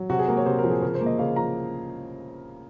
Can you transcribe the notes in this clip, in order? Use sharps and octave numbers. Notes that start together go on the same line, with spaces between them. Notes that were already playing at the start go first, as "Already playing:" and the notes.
Already playing: F#3
C3 F#4
G#4
A#3 A#4
C#5
C3 C5
A#4
F3
G#4
C#3 A#4
C5
A#3
D#5
C#3 F5
F3 A#5